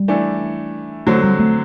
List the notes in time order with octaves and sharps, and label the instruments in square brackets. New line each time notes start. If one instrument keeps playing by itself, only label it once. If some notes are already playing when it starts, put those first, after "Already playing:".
Already playing: [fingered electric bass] G3
[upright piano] E3 A3 D4
[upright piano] D3 F#3 C4 [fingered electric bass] A3
[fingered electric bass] G3
A3